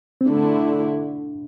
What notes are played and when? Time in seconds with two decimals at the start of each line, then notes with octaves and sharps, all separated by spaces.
0.21 C4
0.26 D3 A3 D4 E4